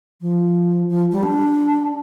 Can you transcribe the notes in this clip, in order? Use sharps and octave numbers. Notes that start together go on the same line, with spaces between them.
F3
F3
G3
D4